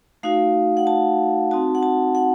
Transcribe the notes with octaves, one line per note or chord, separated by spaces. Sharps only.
A3 D#4 F#4 F5
F#5
A5
C4 D#4 F#4 A5
F#5
A5
F#5